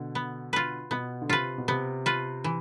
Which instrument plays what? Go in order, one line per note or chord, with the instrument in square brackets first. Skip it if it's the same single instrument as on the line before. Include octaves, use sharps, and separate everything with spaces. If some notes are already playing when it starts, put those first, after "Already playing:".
Already playing: [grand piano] B2 D3
[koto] B3
F4 B4
[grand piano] B2 [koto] B3
[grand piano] D3
[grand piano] C3 [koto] F4 B4
[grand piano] B2
[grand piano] C3 [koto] B3
[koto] F4 B4
E3